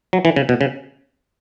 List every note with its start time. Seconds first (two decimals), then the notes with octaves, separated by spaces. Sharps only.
0.13 F#3
0.25 E3
0.36 C#3
0.49 B2
0.61 C#3